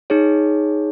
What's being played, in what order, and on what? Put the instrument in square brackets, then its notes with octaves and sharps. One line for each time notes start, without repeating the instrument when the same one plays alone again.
[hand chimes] D#4 G#4 C#5